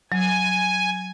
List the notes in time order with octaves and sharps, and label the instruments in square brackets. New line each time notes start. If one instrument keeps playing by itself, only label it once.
[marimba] F#3 [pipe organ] G#5